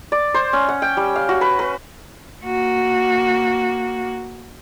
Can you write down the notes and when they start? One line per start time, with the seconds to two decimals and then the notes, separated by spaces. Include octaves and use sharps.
0.12 D5
0.34 C5
0.53 C#4
0.69 F#5
0.82 G5
0.97 G3
1.16 F5
1.29 F#4
1.41 B4
1.59 B4
2.44 A#3 F#4